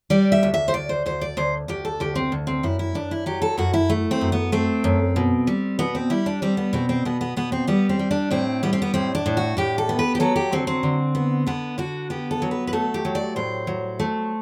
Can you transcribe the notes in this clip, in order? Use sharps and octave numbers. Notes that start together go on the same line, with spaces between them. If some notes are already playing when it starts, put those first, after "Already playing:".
G3 D5
E5
D2
E5
C5
D2 D5
C5
D2 C5
D5
D2 C5
D2 G4
A4
D2 G4
C4
D2
C4
F#2 E4
E4
F#2 D4
E4
F#3 G4
A4
F#2 F#4
E4
A3
C4
F#2
B3
A3 C4
F#2
B2
G3
B2 B3
C4
G3 E4
D4
G3 C4
B3
B2 C4
C4
B2 B3
B3
B2 B3
C4
G3 B3
C4
G3
D4
A2 C4
G3 B3
C4
B3
A2 C4
D4
A2
F#4
A2 G4
A4
B3
B4
G4
F#3 A4
G4
D3 C4
C4
D3
B3
D3 B3
D3 F#4
B3 G4
A4
F#3
B4
B4
A3 A4
G4
F#3
D5
A2 C5
F#3
A3